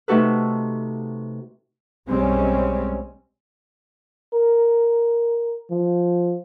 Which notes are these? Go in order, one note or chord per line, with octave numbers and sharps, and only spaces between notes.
C3 A3 D#4 F#4 A4 B4
B1 G3 G#3 C4 C#4
A#4
F3